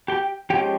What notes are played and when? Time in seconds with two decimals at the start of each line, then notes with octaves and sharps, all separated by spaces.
0.08 G4 G5
0.50 F3 G#3 C#4 G4 G5